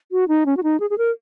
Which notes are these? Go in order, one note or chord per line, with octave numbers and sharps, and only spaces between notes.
F#4
D#4
C#4
F#4
D#4
G#4
G#4
A#4